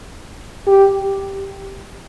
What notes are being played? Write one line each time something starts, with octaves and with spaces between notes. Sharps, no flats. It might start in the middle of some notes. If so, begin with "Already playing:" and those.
G4